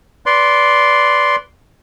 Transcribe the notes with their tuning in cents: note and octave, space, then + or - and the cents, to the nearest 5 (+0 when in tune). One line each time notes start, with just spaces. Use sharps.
B4 +0 D5 -15 C6 +0